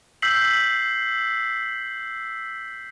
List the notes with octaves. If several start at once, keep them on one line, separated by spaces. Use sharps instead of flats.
E6 G6 B6 C7 F#7